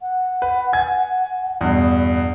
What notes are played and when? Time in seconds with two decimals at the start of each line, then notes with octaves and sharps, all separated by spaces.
0.01 F#5
0.42 B4
0.73 G#5 G#6
1.61 E2 G2 B2